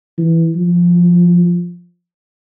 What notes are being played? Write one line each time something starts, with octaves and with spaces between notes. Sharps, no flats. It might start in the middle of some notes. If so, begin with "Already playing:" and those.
E3
F3